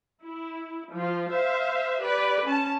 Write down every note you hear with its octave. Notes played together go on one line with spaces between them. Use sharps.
E4
F3 F4
C5 E5 F5
G4 B4 D5
C#4 A5